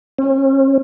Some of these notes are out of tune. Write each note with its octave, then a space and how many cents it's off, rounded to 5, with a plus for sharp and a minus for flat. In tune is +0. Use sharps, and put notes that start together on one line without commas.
C#4 -40